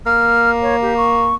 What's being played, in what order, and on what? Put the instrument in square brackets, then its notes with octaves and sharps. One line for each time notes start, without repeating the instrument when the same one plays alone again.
[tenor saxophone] A#3 [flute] F6
[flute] C#5
G4
C#6